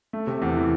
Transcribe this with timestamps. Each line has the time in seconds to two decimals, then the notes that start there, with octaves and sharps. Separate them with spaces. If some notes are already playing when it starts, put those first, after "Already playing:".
0.13 A3
0.27 C3
0.42 E2
0.56 E3